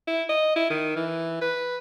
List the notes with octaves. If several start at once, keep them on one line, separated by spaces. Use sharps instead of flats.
E4
D#5
E4
D#3
E3
B4